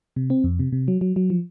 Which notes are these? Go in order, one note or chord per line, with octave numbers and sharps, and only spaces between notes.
C3
C4
F2
C3
C3
F#3
F#3
F#3
F3